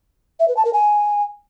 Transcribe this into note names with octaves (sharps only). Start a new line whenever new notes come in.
E5
B4
A5
A#4
G#5